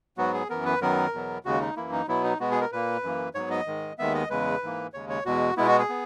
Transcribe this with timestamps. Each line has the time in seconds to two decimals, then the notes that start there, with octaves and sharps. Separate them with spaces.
0.18 G#2 F#3 B3 F#4
0.33 G#4
0.50 F#2 E3 B3 A#4
0.65 B4
0.81 F#2 D#3 F#3 B3 A#4
1.13 E2 B2 F#3 B3
1.44 D#2 C#3 G#3 F#4
1.60 D#4
1.77 F#2 E3 A#3 E4
1.92 D#4
2.08 B2 F#3 B3 E4
2.24 D#4
2.40 B2 G#3 B3 F#4
2.51 G#4
2.61 A#4
2.72 A#2 A#3 B4
3.03 F#2 E3 A#3
3.35 G#2 F#3 B3 C#5
3.51 D#5
3.66 G#2 D#3 G#3
3.98 D#2 D#3 G#3 B3 E5
4.14 D#5
4.30 E2 C#3 G#3 B4
4.63 G#2 E3 A#3
4.94 D#2 C#3 G#3 C#5
5.09 C#5
5.25 E2 B2 G#3 F#4
5.57 B2 G#3 B3 E4
5.68 F#4
5.79 G#4
5.89 B3